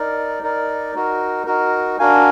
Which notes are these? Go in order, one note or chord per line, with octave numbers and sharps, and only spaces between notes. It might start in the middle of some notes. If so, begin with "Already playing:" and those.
Already playing: D#4 A#4 D5
D#4 A#4 D5
D#4 F#4 A#4
D#4 F#4 A#4
D4 F#4 A#4 F5 G#5